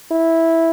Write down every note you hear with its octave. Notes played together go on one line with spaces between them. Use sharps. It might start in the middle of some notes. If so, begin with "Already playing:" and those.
E4